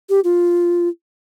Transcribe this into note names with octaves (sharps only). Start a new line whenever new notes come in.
G4
F4